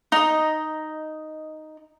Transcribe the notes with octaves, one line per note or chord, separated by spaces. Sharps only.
D#4 D#5